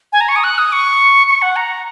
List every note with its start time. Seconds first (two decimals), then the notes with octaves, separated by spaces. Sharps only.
0.13 G#5
0.21 A#5
0.29 C#6
0.36 D#6
0.44 F#6
0.58 D#6
0.73 C#6
1.29 C#6
1.42 F#5
1.56 A#5